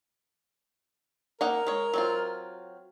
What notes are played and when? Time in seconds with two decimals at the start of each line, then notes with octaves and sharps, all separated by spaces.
1.41 A#3 D#4 A#4 F#5
1.67 G#3 C#5
1.94 F#3 C4 F4